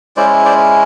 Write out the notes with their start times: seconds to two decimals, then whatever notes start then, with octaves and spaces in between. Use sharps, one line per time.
0.16 G#3 C#4 E4 C5 D5
0.45 C5 D5